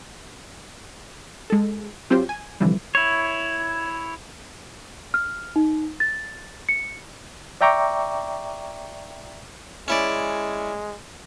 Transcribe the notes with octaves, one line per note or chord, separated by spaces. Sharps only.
G#3 A4
F#3 C4 F4 G4 C5
G#5
C2 D3 E3 F3 G3
E4 C#5
F6
D#4
A6
C#7
D5 E5 G5 A#5 C#6 D6
G#3 C#4 E4 D5